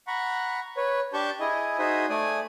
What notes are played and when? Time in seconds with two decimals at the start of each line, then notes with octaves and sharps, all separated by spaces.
0.07 F#5 A#5 B5 C#6
0.77 B4 C#5
1.14 D4 G4 A5 C#6 G6
1.40 E4 G#4 D#5
1.79 D#4 F#4 G#4 C5 E5 D#6
2.09 A3 D5 G#5 D#6